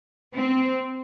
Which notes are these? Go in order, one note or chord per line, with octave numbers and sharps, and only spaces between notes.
C4